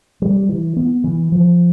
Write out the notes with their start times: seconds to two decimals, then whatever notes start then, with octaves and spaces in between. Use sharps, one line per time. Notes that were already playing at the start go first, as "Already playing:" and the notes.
0.22 G3
0.49 E3
0.76 B3
1.04 E3
1.32 F3